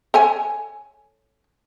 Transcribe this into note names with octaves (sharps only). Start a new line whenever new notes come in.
A4 C#5 G#5